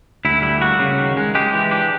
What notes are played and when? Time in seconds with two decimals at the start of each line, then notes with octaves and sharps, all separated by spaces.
0.25 D2 E4
0.42 G3 E4
0.61 A#3 F#4
0.80 C#3
0.99 D#3
1.17 G#3
1.35 G#3 G4
1.53 E3
1.71 D4 G4